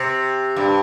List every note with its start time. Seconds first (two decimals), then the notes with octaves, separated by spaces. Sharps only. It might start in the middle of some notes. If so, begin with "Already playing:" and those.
Already playing: C3
0.56 G2